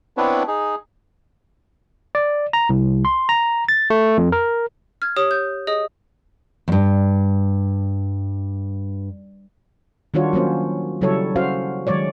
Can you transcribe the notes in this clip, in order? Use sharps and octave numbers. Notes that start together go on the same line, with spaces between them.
B3 C4 D4 E4 B4 C#5
D#4 G#4
D5
A#5
C2
C6
A#5
A6
A3
F2
A#4
F6 G#6
G4 C#5 D#6
G6
G#4 D#5 D#6
E2 G2
D#3 G3 D4 F4 F#4 C#5
F#3 A#3 C#4 C5
C#3 F#3 G3 E4 A4 C#5
C#4 F#4 C5 F5
D#3 F#3 G#3 C#5 D5